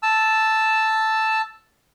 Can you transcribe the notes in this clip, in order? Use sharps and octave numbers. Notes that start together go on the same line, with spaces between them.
A5 E6